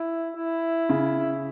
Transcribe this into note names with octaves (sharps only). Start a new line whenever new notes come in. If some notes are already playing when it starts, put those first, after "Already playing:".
Already playing: E4
E4
C#3